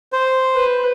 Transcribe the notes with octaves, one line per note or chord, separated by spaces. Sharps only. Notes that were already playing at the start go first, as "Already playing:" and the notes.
C5
B4